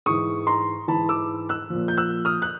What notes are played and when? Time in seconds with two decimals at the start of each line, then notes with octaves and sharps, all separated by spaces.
0.06 G#2 E3 C#6 D#6
0.47 A#5 C6
0.88 G#2 E3 A5 B5
1.09 D6 E6
1.49 E6 F#6
1.70 A#2 F3
1.88 G6
1.97 E6 F#6
2.25 D#6 F6
2.42 F#6